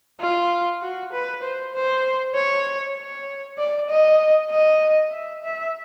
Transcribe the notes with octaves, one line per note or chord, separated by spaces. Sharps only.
F4
F#4
B4
C5
C5
C#5
C#5
D5
D#5
D#5
E5
E5